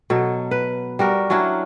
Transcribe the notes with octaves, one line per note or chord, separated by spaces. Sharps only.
B2 F#3 A4
B4
G3 F#4 A#4
F#3 C#4 D4 E4